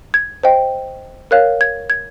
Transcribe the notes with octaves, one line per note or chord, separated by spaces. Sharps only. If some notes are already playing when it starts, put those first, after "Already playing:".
G#6
C5 D#5 G5
A#4 C#5 F5 F#6
G#6
G#6